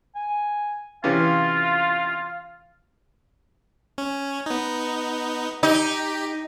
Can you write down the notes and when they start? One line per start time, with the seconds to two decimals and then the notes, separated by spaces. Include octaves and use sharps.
0.15 G#5
1.04 C3 E3 C#4 F4 F5
3.98 C#4
4.46 B3 D#4
5.63 D#4 G4